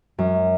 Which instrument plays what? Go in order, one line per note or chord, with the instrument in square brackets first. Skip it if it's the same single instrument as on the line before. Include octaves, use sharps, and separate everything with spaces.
[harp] F#2